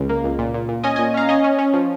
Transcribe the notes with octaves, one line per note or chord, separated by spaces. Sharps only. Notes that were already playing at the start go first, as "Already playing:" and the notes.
Already playing: C#2 C#3
A#3
C#2
A#2
A#2
A#2
C#4 D#5 G#5
A#2 D#5 G#5
C#4 F5 A#5
C#4 D#5 G#5
C#4
C#4
F3